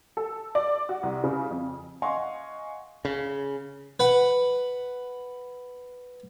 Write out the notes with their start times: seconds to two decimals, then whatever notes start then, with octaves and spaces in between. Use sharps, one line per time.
0.17 A4
0.55 D5
0.89 F#4
1.03 C2
1.24 C#3
1.51 F2
2.02 D#5 F5 F#5 G#5 C6 C#6
3.05 C#3
4.00 B4 F#5